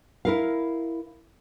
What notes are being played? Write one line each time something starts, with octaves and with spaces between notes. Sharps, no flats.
E4 A#4 F5